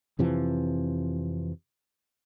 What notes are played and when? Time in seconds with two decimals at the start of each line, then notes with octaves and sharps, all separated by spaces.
0.19 F2 C3 E3 F3